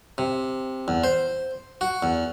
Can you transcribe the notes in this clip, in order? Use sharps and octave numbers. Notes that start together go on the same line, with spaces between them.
C3
E2
C5
F#4
E2